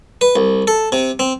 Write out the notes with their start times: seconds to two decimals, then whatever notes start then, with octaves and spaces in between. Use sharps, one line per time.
0.21 B4
0.36 C2
0.67 A4
0.92 C3
1.19 C4